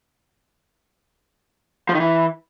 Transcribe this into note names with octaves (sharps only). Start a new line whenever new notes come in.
F3
D#3
E3